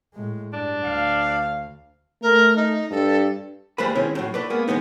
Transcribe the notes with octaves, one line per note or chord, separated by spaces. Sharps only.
A2 G#3
G2 D4
D2 F5
A3 A#4
D#4
G2 A4
D#2 G3 G#3 B4 C5 B5
D#3 G#3 C4 C#4 E4 C#5
A2 F#3
A3 B4 D5
G#3 A#3 B3
D#3 G#3 B3 D#4